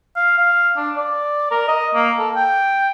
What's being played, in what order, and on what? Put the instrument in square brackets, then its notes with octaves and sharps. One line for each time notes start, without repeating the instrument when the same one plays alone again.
[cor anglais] F5
F5
D4
D5
A#4
D#5
A#3
A4
G5